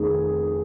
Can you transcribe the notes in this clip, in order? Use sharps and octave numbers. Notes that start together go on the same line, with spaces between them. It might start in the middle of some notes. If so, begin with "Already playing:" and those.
Already playing: F1 D#3 G#4